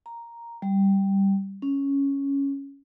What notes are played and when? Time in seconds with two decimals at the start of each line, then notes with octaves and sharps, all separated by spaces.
0.06 A#5
0.62 G3
1.62 C#4